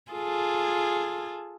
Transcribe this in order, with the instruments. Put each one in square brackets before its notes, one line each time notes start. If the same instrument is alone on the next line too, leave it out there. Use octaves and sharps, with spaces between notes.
[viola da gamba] F4 G#4 A4